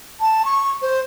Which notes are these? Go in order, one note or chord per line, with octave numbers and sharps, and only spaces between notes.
A5
C#6
C5